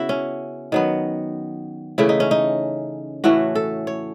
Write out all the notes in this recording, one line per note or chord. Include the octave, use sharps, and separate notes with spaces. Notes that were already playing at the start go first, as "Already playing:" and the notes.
Already playing: C#3 B3 E4 F#4
C#4
D#3 F#3 B3
C#3 E3 A3 E4
D#4
C#4
D#4
A2 E3 A3 C#4 F#4
A4
C#5